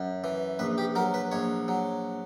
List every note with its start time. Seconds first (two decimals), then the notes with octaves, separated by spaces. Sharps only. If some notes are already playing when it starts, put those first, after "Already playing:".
Already playing: F#2
0.24 E3
0.59 A#1 B4
0.78 G4
0.95 F#3 A#4
1.14 B4
1.32 A#1 C#5
1.68 F#3